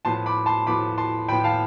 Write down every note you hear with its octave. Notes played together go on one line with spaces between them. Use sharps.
A2 F3 B3 A5 C6
B5 D6
A5 C6
A2 F3 B3 B5 D6
A5 C6
A2 F3 B3 G5 B5
F5 A5